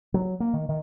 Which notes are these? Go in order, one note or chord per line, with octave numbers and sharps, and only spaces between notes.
F#3
A#3
D#3
D#3